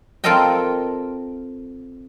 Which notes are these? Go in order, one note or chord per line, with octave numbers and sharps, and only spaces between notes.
C4 F4 A4 A#4 D#5 G5